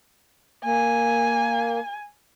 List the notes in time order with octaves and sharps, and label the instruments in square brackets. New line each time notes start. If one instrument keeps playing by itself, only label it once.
[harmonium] A#3 [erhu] G#5